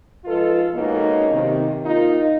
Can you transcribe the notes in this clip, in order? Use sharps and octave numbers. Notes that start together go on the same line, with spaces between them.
G#2 F3 F4 A4 B4 D#5
B2 G#3 A#3 C#4 D#4
C3 D#3
A#3 D#4 F4